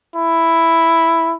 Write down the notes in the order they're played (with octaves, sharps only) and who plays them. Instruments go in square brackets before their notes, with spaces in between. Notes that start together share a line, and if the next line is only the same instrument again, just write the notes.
[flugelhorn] E4